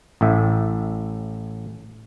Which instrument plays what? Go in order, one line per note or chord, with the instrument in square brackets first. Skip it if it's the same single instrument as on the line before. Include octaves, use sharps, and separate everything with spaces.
[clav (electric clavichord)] A1 A2 E5